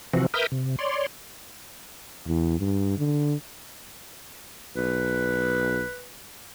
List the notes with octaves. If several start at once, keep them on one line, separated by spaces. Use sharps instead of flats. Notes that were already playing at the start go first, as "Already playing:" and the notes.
C3 E3 F3 C4 F#4
A#4 B4 E5 D#6 F6 G6
C3
C#5 D5 C6
E2
G2
D3
B1 B4